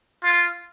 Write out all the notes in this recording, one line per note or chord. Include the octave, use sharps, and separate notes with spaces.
F4